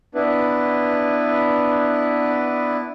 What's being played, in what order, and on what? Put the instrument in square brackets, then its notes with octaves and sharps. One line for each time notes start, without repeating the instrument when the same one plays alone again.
[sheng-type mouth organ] B3 D4 E4 B4